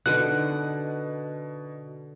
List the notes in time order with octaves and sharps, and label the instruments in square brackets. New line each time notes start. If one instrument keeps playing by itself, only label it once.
[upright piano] B2 D#4 B4 [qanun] D3 F#5 [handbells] F#6